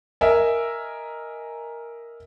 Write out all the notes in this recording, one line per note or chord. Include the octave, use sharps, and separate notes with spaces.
A#4 D#5 E5 G#5